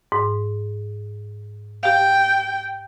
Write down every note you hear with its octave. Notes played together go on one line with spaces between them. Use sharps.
G#2
G4 F5 G5